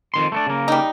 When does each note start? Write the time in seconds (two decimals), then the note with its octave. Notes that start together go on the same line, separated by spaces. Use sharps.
0.14 F2 D#3 C6
0.32 A3 B3 D4
0.47 C#3 A#3
0.68 G3 D#4